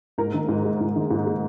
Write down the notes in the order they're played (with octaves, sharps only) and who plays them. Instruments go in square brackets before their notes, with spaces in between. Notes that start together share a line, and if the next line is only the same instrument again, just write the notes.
[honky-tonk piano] G#2 A#4
D#3
G#2
G#3
G#2
D#3
G#2
G#3